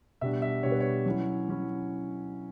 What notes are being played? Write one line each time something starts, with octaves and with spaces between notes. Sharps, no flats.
B2 G3 D4 E5
E5
B2 G3 D4 C#5
B4
C#5
F#3 C#4 E4
F#3 C#4 E4